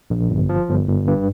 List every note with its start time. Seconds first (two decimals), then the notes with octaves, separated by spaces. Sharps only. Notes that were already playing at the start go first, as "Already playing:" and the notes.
0.10 A#1
0.30 G1
0.49 F3
0.68 G1
0.88 G1
1.08 G2